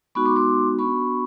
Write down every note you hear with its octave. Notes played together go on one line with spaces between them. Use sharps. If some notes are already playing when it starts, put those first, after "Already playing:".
G#3 B3 D#4 F#4 B5 C#6
C6 D6
C6 D6
B3 D4 F#4 B5 C#6